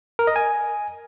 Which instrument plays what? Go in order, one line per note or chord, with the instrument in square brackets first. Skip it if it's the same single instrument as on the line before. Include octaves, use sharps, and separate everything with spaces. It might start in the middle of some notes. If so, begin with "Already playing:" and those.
[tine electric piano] A#4
D#5
G#5